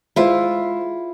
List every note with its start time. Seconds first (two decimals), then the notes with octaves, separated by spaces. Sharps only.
0.16 G#3 E4 F4 C5